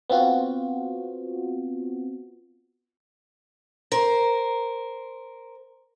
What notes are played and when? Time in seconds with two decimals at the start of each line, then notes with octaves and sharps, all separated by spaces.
0.09 B3 C4 F4 F#4
3.92 A#4 C5